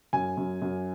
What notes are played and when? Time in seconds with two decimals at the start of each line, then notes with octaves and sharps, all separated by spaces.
0.13 F#2 G#5
0.37 F#2
0.62 F#2